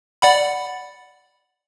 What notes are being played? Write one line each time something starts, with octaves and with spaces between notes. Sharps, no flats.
D5 F#5 B5